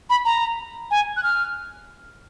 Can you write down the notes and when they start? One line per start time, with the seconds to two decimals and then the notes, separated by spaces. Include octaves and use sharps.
0.10 B5
0.25 A#5
0.91 G#5
1.17 F#6
1.23 F6